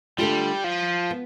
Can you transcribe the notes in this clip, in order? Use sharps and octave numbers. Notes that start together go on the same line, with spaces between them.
D3 G3 A3 D4 F4
F3
B3